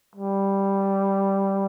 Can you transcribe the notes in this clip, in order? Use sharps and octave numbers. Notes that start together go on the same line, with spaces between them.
G3